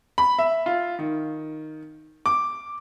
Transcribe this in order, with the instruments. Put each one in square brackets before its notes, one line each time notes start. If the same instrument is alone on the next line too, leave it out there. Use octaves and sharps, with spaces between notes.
[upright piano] B5
E5
F4
D#3
D6